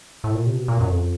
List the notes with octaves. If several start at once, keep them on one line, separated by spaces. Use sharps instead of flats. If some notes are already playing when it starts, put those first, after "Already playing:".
A2
A#2
C3
B2
A#2
F#2
F2